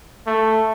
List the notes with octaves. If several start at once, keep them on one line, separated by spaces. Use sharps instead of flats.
A3